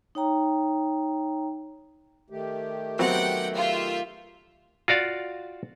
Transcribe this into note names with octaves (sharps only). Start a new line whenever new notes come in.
D#4 C#5 G5 A#5
D#3 A3 G4
F#3 B3 C4 F#5 G5
F4 E5
F4 F#4 D5 F5